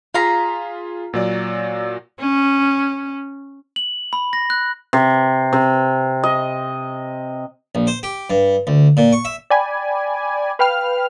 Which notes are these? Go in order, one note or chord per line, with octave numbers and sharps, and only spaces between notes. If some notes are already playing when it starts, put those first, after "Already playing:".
F4 G#4 F5 A#5 B6
A#2 F#3 D5
C#4
F#7
B5
A#6
F#6
C3
C3
D#5
A#1
C5
G4
G2
D2
A#2
C#6
E5
D5 G5 G#5 B5
B4 F5 G5 B5 F6